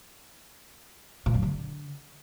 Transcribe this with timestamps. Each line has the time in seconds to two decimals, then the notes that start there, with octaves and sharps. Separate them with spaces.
1.26 A#2
1.34 F#2
1.43 D3